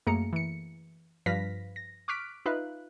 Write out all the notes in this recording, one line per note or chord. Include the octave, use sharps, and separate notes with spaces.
F#2 A3 A#3 G#4 A#5 C#7
E3 C#7
G2 F3 B4 F5 A#6 B6
A#6
C#6 D6 F6 F#6 B6 D7
D#4 F4 B4 E5 F5 F#6